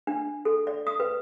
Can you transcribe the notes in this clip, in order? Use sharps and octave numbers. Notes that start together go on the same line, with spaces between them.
D4
A4
D5
D#6
B4